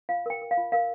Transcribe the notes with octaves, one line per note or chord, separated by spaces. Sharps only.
F4 F5
A#4 G5
A#4
F5
F4
A#4 F5